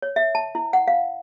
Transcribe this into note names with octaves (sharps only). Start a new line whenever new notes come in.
C#5
E5
A5
E4
F#5
F5